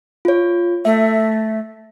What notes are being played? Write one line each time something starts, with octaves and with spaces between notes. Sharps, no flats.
F4 C#5
A3 E5